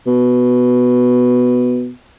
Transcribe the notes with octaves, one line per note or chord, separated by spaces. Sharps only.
B2